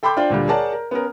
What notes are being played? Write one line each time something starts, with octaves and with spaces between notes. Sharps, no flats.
A4 G5 B5 C6 D6 G6
D4 F4 C5 D5 G5
D2 A#2 D3 G3
G#4 A#4 C#5 D5 F#5 A5
A#4
B3 C#4 A#4